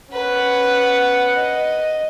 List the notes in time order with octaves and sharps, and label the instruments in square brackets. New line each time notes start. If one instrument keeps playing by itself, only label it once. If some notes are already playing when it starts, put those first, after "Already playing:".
[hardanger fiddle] C#4 B4 [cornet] F#5
[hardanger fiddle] D#5